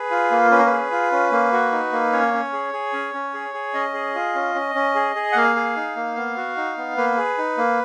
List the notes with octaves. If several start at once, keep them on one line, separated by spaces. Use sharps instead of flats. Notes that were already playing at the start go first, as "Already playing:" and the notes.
Already playing: G#4 B4
F4
A#3
C#4 B4
A#4
B4
G#4
F4
C#4
A#3
F#4
D#4
A#3
C#4 C#5
C#4
G#4
G#4
C#4
C#4
G#4
G#4
C#4 D#5
G#4
F4
C#4
C#4
C#4
G#4
G#4
F#5
A#3 F5
G#4
D#4
A#3
B3
F#4
D#4
B3
A#3 B4
G#4
D#4
A#3